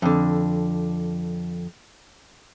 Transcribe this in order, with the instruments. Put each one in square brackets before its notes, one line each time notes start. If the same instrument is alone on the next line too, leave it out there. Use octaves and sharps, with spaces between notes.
[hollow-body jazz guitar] F2 D3